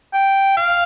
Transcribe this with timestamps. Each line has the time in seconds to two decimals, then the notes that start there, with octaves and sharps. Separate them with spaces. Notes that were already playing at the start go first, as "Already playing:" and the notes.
0.13 G5
0.57 F5